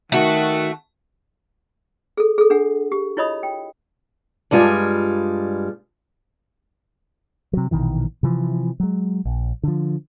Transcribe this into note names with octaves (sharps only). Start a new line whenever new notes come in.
D#3 A3 F#4
G#4 A4
G#4 A4
D4 G#4 F#5
G4
E4 F4 C#5 D#5 B5 D#6
G5
G2 G3 G#3 F4 A#4 G#5
C3 F#3
A#1 B2 D#3 E3
C3 E3 F3
F#3 G#3
A#1
D3 F3